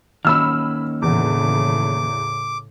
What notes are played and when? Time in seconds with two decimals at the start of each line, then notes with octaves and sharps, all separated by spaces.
0.25 D#3 A#3 C#4 B5 E6 F6
1.02 E2 A2 C#3 D6